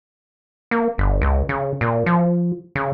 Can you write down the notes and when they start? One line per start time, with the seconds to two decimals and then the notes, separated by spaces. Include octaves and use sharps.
0.71 A#3
0.98 G1
1.22 C#2
1.49 C#3
1.81 A#2
2.06 F3
2.75 C#3